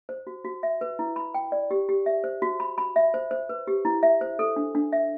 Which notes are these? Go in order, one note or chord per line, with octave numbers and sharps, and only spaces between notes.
C5
F#4
F#4
E5
B4
E4
B5
G5
D5
G4
G4
E5
C5
F#4
B5
B5
E5
C5
C5
B4
G4
E4
E5
C5
A4
D4
D4
E5